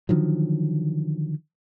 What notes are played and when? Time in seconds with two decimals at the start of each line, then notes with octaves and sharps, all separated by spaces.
0.09 D3 D#3 F3 F#3